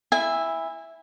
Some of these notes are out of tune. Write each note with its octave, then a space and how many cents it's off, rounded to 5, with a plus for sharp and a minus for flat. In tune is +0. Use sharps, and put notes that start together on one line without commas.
E4 +0 E5 +0 G#5 -30